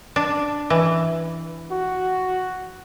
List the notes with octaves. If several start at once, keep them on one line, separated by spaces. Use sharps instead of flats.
D4
E3
F#4